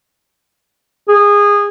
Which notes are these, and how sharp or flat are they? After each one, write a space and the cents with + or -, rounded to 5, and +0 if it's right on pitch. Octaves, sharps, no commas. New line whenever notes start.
G#4 -20